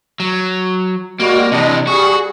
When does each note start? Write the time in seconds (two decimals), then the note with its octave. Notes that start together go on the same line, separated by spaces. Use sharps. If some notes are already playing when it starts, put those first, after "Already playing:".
0.20 F#3
1.20 G3 G#3 A#3 F#4
1.52 C3 E3 D4 D#5
1.87 G3 F#4 G#4 C#6